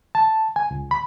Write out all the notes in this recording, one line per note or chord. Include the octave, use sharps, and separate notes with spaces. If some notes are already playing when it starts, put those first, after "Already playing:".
A5
G#5
C#2
B5